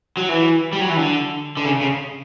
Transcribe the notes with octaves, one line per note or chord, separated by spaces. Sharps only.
F#3
E3
G3
F#3
E3
D3
D3
C#3
C#3